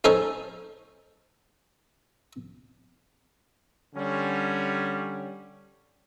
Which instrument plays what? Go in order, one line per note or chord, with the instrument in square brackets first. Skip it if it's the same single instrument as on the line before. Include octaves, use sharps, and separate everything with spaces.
[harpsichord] C#4 D#4 A4 C5 C#5 B5
[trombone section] D3 G3 C#4